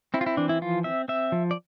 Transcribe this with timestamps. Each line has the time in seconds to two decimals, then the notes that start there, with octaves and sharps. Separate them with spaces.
0.14 C4 E4
0.21 F4
0.26 E4
0.37 E3 D4
0.49 E4
0.62 F3 F4
0.84 C4 E5
1.08 C4 E5
1.32 F3
1.51 D5